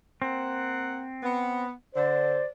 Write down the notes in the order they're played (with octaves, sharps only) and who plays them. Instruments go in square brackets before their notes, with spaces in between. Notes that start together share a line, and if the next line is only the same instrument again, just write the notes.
[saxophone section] A#3 F#5 [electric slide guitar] C4
[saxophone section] B3
[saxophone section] D3 [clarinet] C5 [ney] D5